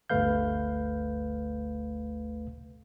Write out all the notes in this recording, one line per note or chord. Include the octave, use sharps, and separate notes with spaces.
G1 D2 A3 B4 F5 G6